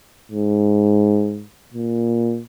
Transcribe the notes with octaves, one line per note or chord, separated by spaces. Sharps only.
G#2
A#2